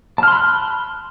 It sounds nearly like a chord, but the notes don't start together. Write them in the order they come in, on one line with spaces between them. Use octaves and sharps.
A5 F6 C6 B5 F#6